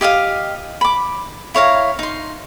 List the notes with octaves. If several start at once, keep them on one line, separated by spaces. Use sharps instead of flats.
G4 D#5 F5 D#6
B5 D6
E4 C#5 F5 A#5
D#4 C6